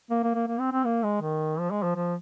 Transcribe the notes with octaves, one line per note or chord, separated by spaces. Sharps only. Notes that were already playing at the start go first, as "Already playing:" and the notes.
A#3
A#3
A#3
A#3
C4
C4
A#3
G#3
D#3
F3
G#3
F3
F3